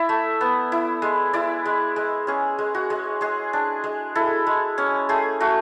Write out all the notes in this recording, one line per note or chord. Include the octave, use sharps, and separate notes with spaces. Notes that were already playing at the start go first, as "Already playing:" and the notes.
Already playing: E4 D5 E5
A3
B3
E4
G#3
E4 D5
G#3
G#3
C#4 G#4
G#3
F#4
G#3
G#3 G#4
D4
G#3
E4 A4
G#3
C#4
A3 G#4
A3 F#4